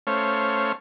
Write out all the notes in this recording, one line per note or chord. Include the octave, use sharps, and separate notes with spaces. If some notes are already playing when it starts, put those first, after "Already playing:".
A3 C#4 C5 C#5 F5